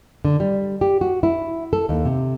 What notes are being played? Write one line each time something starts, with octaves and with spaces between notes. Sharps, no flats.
D3
G3
G4
F#4
E4
A4
D#2
C3